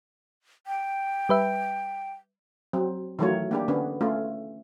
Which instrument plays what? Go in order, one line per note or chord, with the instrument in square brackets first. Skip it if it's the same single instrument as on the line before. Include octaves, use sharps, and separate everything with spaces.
[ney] G5
[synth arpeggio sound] G3 B4 E5
[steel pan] F#3 C4
D#3 E3 F#3 A3 F4 C#5
A#3 D4 G4
D3 B3 C#4 D4
A3 C#4 F4